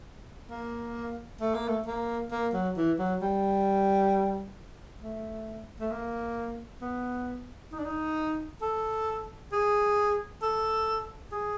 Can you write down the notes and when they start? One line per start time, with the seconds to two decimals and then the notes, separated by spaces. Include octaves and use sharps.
0.50 A#3
1.41 A3
1.54 A#3
1.68 A3
1.86 A#3
2.31 A#3
2.53 F#3
2.76 E3
2.99 F#3
3.21 G3
5.01 A3
5.80 A3
5.91 A#3
6.81 B3
7.72 D#4
7.79 D4
7.86 D#4
8.62 A4
9.52 G#4
10.42 A4
11.32 G#4